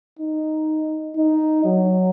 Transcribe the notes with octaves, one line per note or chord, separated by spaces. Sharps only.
D#4
D#4
F#3